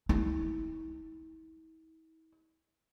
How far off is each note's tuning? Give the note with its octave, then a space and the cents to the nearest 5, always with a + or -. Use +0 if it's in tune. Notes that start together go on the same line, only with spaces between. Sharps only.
E4 -45